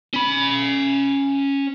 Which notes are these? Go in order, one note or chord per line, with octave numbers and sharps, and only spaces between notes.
C#4 B5